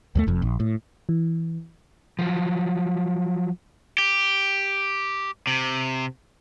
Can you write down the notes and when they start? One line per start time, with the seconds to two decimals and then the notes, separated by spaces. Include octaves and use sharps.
0.15 D#2 F#3 A3
0.27 F1 F2
0.42 A#1
0.60 A2
1.09 E3
2.19 F3 F#3
3.98 G4
5.47 C3